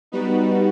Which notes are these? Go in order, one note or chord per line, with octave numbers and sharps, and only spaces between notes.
G3 B3 D#4 F#4 B4